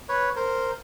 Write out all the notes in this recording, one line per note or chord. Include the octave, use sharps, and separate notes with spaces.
B4 C#5
A#4 C5